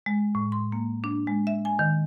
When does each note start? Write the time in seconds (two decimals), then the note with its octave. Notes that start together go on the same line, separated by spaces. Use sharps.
0.06 G#3
0.35 A2
0.52 C6
0.72 A#3
1.04 D4
1.27 G#3
1.47 E5
1.65 G#5
1.79 D#3